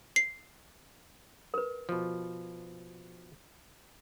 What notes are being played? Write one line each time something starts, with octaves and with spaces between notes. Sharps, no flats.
C7
A#4 B4
B2 F3